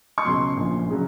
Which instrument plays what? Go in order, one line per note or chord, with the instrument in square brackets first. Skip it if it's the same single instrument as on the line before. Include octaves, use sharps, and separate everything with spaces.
[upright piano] C#6
C#2 B2 F#3 C6
A#1 A#2 F3
C#3 F#3